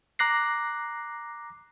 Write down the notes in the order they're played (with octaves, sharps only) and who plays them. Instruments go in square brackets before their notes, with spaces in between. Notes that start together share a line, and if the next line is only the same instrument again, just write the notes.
[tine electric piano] A#5 D6 F#6 A#6 C7